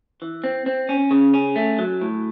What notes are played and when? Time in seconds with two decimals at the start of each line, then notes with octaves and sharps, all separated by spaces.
0.22 E3
0.44 C4
0.66 C4
0.89 C#4
1.11 C#3
1.34 C#4
1.56 A3
1.79 F#3
2.01 A2